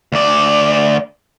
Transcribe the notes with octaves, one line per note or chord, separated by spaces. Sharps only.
D2 D5